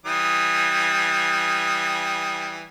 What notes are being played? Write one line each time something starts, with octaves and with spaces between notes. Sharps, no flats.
E3 G3 D#6